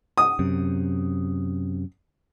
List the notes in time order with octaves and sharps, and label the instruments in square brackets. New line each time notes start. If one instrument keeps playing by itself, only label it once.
[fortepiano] D#6
[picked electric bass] F#2 C3